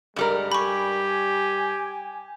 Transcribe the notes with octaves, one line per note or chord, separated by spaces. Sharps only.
G2 G3 G#3 A#4
G4 G#5 B5 C#6